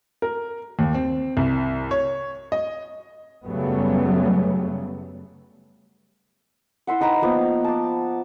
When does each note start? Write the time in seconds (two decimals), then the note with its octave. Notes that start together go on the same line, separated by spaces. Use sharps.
0.22 A#4
0.79 D#2
0.95 C4
1.37 C2
1.91 C#5
2.52 D#5
3.45 F#2 C#3 F#3 G3 A3 B3
6.87 E4 C5 E5 F#5
7.01 D#4 B4 G5 A#5
7.22 F3 A#3 B3
7.64 A5 D6